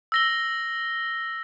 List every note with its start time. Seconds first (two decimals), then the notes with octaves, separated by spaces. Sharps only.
0.12 E6 A#6 G7